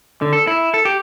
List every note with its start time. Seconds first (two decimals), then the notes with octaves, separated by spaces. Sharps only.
0.22 D3
0.33 A4
0.47 E4
0.74 A4
0.85 G4